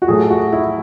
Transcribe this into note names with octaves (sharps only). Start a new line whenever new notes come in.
F#4
A2 F#3 A3 G#4
F#4
E4